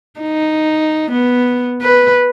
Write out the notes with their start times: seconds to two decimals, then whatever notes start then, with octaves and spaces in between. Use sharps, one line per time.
0.21 D#4
1.11 B3
1.82 B4